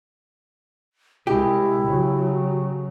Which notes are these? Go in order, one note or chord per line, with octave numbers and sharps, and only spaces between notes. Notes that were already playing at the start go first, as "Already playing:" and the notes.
C2 G#3 E4 G4
C#3 F#3